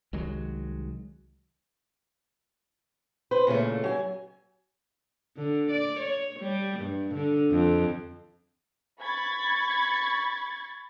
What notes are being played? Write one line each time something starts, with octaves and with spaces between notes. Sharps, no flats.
C2 D#3 F#3 G#3
B4 C5
A#2 C#3 E3 A3
F#3 G#5
D3
D5
C#5
G3
G2
D3
F2
B5 C#6 G#6 A6